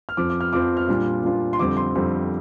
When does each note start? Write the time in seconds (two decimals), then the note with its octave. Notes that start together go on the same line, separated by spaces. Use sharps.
0.09 F6
0.17 F2 F3 C4 D6
0.30 D6
0.40 F6
0.53 F2 F3 C4 D6
0.77 F6
0.88 A#2 G3 D4 F4
1.24 A#2 G3 D4 F4
1.53 C6
1.59 F2 D3 G3 C4 D6
1.77 C6
1.95 F2 D3 G3 C4